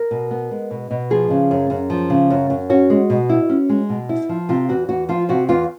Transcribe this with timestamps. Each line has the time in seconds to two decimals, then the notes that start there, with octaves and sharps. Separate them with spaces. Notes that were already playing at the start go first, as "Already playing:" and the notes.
Already playing: A#4
0.11 B2
0.31 B3
0.51 G#3
0.71 B2
0.91 B2
1.10 F3 G#4
1.30 C#3
1.51 F#2
1.70 F#2
1.90 F3
2.10 C#3
2.30 F#2
2.50 F#2
2.70 C#4 F#4
2.90 G#3
3.10 B2
3.29 E4
3.49 C#4
3.69 G#3
3.89 B2
4.09 E4
4.29 F3
4.49 C3 F4
4.69 E2 F#4
4.89 E2 F#4
5.09 F3 F4
5.29 C3 F#4
5.49 E2 F4